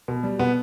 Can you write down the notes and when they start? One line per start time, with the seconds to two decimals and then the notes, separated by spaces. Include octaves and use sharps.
0.08 B2
0.23 G3
0.39 B2 B3